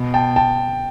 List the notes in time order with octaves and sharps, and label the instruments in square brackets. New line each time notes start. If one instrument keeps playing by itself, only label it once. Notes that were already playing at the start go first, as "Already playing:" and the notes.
Already playing: [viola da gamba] B2
[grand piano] G5 A5
G5 A5